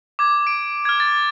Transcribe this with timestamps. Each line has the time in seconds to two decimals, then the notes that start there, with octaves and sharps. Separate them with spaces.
0.19 D6 G#6
0.47 D7
0.85 F6 G#6
1.00 A6